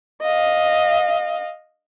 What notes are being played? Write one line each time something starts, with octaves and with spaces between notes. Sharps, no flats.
D#5 F5